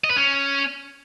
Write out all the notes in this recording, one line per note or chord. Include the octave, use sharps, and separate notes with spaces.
D#5
B4
C#4